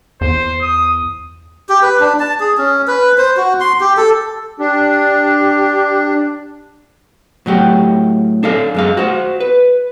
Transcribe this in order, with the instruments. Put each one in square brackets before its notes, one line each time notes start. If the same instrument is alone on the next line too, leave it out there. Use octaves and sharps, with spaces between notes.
[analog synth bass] E2 [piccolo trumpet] C5
[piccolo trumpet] D#6
[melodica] G4
B4
D4
A5
G#4
C#4
B4
C5
F#4
C6
G4
A4
[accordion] D4 [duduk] G4
[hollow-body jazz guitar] A2 F#3 G4
D4 A4 F5
F#2 G#3 F5
F#4 C5
B4